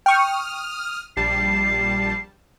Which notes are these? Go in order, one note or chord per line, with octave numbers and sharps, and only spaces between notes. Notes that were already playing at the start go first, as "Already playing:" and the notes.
G5 C#6 D#6 F6
A#1 G3 A5 C7